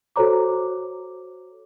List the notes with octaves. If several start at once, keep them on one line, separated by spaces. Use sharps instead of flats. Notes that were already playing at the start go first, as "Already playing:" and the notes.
F#4 A4 C5 C#5 A#5 D6